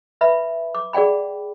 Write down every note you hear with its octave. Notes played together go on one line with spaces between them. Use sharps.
B4 E5 B5
D6
G#4 D5 F#5 G5 B5